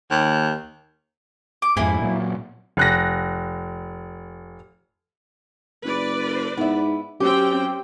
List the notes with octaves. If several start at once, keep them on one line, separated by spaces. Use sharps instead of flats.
D#2
D6
F2 G#2 A#3 E4 G#5
A#2 F#3
F1 F#6 A#6
F#1 B4 D5
G#2 B3 E4
F#2 C4 C#4 G4 G5